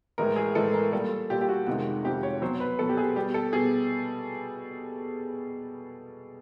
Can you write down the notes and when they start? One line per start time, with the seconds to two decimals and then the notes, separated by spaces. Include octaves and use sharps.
0.18 A2 E3 G#3 A#4
0.36 G#4
0.55 A2 E3 G#3 A4
0.74 A#4
0.92 A#2 G3 A4
1.30 A#2 G3 G4
1.41 G4
1.49 F#4
1.67 F2 C3 D#3 G#3 F#4
2.04 F2 C3 D#3 G#3 G4
2.23 C#5
2.42 B2 F#3 C5
2.60 B4
2.79 B2 F#3 A4
2.89 G4
2.97 G#4
3.16 B2 G3 G4
3.34 A4
3.53 B2 G#4